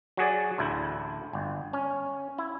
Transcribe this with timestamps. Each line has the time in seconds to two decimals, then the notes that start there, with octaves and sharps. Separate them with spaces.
0.17 F#3 F#4 G#4 D5
0.58 A1 D2 E4
1.33 G1
1.73 C#4
2.38 E4